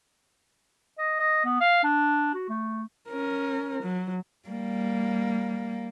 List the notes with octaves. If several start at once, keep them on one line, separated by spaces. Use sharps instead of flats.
D#5
D#5
B3
F5
D4
F#4
A3
C#4 A#4
F#3
G3 A#3